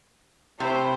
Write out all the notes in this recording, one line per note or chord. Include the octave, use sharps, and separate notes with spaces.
C3 A3 E4 C5